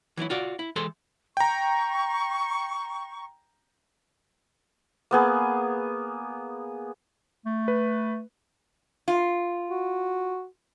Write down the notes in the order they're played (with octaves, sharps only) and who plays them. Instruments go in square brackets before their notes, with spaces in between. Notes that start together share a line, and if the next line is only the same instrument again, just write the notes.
[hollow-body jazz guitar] E3 F#3 D4 E4
F4 F#4 D5
E4
E3 G#3 A4 C5 C6
[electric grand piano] G5 A#5 [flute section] C#6
[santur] A#3 B3 G#4
[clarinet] A3
[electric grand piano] B4
[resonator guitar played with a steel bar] F4
[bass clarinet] F#4